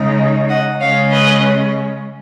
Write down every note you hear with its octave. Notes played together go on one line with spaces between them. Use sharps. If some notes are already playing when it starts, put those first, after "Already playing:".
Already playing: C#3 G#3 D#4
D#5 F#5
C#3 G#3 C#4 C#5 F5
B4 D#5